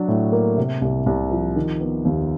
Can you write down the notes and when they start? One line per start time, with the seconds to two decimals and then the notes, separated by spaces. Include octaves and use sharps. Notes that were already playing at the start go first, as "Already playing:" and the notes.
Already playing: F#3 D4
0.08 A2
0.32 A#3
0.57 C3
0.82 C2
1.06 C2
1.31 F3
1.56 D#3
1.81 B3
2.05 D#2